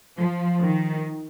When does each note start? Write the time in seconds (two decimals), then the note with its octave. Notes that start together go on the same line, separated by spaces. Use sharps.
0.19 F3
0.64 D#3